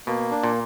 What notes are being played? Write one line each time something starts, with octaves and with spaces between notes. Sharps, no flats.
B2 A#3
D4
A#2